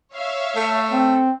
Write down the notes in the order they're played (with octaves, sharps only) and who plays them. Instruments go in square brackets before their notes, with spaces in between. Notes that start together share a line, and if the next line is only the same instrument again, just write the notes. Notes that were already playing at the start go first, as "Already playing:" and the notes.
[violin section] C#5 E5 F5
[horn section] A3 A4
[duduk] C4